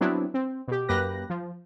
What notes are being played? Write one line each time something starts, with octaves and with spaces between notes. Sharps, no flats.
F#3 B3 C4 D4 E4
C4
B2 G4
F#2 A#3 G4 B4 F#6 A#6
F3